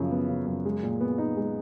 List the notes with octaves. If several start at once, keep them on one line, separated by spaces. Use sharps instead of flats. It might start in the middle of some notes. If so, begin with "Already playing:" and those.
Already playing: F#2 C#3 F3
B3
C#3
F#2
G#3
A#2
B3
D#4
G#3